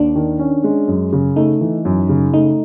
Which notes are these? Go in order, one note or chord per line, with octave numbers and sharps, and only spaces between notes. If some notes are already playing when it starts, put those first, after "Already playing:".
Already playing: D#2 D4
D#3
C#4
G#3
F#2
C#3
A3 D#4
E3
F#2
C#3
A3 D#4